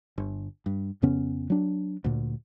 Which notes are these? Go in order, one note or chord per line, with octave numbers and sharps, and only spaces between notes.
G1
G2
F2 C#3 B3 C#4
F#3 D4
D2 A#2